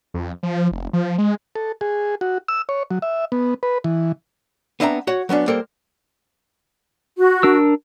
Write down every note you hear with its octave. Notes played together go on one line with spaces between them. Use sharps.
F2
F3
F1
F3
G#3
A4
G#4
F#4
E6
C#5
F#3
E5
B3
B4
E3
B3 C4 D4 E5 G#5 A#5
F#4 C#5 F#5
F#3 B3 C#4 D4
G3 A#3 A4 A#4 C5
F#4
D4 A#4 E6